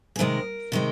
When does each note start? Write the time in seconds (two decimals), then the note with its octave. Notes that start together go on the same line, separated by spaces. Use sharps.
0.16 G#4
0.19 C3 D#3 G#3 A#4
0.72 C3 D#3 G#3